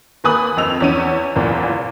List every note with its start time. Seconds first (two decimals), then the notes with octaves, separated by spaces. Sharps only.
0.24 D#2 A#3 B4 G#5 D#6 F#7
0.57 F2 C4 D#5 E6 F7
0.80 E2 C#4 D#7
1.36 F#1 E2 A#2 D4